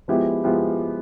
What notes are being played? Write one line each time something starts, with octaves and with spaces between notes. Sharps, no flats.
F3 G#3 B3 E4 G4
F3 G#3 B3 E4 G4